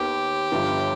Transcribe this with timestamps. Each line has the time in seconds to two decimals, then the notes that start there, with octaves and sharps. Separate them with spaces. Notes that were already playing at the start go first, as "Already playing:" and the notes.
Already playing: D#2 D#3 B3 G4
0.51 G1 G2 D3 F3 B3